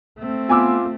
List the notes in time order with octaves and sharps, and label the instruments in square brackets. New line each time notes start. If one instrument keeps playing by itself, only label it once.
[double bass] A3 C4
[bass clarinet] B3 [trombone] F4 [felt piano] G#5 D6 E6